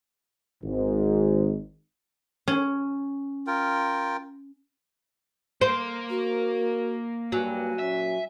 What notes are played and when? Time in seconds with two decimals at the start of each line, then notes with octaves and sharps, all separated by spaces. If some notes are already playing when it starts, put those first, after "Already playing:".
0.64 G#1 G#2
2.48 C#4
3.47 F4 A#4 G5
5.61 A#3 C5
6.10 F#4 A#4
7.32 G2 F#3 G#5
7.79 A#2 C#4 E5